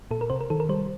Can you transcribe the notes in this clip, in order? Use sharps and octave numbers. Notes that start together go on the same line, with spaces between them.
A#2 A4
A#4
C3 C5
A#4
D#3 A4
A#4
G3 C5